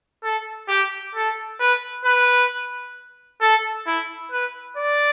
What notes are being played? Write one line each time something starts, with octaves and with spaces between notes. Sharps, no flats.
A4
G4
A4
B4
B4
A4
E4
B4
D5